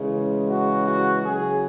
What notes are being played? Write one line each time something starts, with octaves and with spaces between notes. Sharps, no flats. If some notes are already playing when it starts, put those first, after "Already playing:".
Already playing: C#3 E3 G#3
F#4
F#4
C#3 F#3 G#4